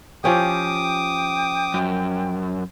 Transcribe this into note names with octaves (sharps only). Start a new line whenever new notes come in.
F3 C#4 G4 G5 D6 D#6
G5
F#2